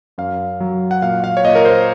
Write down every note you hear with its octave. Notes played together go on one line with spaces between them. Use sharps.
F#2 F5
F#3
F#5
A#2 F5
F5
C#5
A#2 D#5
A#4
C5